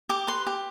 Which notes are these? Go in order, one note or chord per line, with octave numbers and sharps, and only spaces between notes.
G4 D6
B4 C6
G4